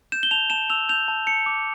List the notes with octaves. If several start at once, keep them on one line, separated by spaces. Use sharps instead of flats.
G6 E7
G7
A5 F7
A5 E7
E6 F7
G6 F7
A5
A5 C#7
D6